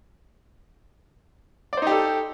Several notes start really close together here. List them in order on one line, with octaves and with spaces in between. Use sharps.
D5 C5 D#4 G4 A4